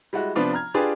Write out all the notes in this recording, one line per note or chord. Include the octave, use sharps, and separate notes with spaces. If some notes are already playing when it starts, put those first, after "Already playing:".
G3 G#3 E4 F#4
C3 F3 B3 D4 F4
A#5 F6 G#6
D4 F4 G4 G#4 B4 D5